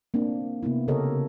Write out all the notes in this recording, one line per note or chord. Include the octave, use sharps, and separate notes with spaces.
A#3 C4 D4
C3 A#3 B3 E4
C#3 G4 A4 A#4 C#5 D#5